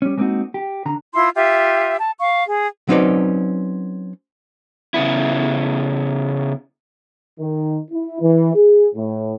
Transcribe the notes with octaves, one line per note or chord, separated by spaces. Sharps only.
G3 C#4
G#3 A#3 C4 D4 D#4 F#4
G4
D3 A#5
E4 F4 C6
F4 G4 E5
A5
F5 C#6
G#4
F#3 C4 C#4 D#4 B4 D5
C#3 B3 E4
D#3
E4
E3
G#4
A2